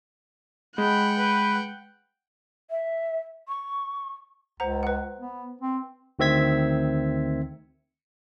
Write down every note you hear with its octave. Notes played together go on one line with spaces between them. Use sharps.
G#3 F#5 G5 B5
B4
E5
C#6
C#2 C5 F#5 A#5
B4 F#5
B3
C4
D2 D#3 C4 E5 G#6 B6